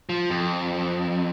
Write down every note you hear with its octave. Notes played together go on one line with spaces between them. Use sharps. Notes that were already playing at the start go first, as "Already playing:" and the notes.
F3
F2